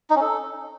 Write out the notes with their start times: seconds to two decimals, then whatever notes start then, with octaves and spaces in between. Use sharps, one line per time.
0.10 D#4
0.16 C#4
0.21 A4